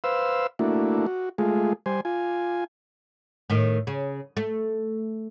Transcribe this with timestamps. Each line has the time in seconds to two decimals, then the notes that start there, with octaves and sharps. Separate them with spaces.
0.04 B4 C5 F5 E6
0.59 A3 A#3 D4 E4 F#4
1.06 F#4
1.38 G#3 A3 F4 G#4
1.86 G3 C5 G#5
2.05 F4 G#5
3.50 A2 D#3
3.87 C#3
4.37 A3